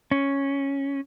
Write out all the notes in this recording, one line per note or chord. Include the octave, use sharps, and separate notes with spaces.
C#4